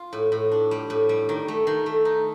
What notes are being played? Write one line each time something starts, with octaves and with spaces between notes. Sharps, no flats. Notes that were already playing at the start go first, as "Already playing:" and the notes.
Already playing: F4
A2
A2
D4
G3
A2
G3
D#3
A3
D#3
A3
D#4